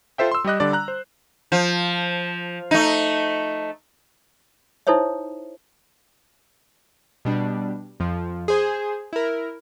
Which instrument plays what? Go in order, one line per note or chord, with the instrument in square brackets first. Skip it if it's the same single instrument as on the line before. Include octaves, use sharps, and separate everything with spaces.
[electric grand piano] F4 A4 C5 E5 G5
C6 E6
G3 G4 D#5 F#6
D3 G3 D4 D5
A#5 F#6
C5
[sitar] F3
A3 D#4
[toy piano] D#4 E4 A4 C5 C#5 E5
[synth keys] B2 G3 D4
F2 F3
G#4 C5
E4 A#4